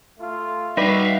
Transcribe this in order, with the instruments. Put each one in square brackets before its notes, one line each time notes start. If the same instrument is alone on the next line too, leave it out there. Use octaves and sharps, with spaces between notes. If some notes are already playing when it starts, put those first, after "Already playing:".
[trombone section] A3 F4
[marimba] G3 [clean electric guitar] D#4 B4 D5 [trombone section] F#4 [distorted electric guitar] E5 F5